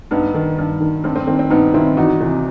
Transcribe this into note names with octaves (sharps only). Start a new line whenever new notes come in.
G2 B3 D#4
D#3
G2
D#3
G2 C4
C4
D#3 C4
C4
G2 B3 D#4
D#3 C4 E4
E2 D#4 F#4
C3 E3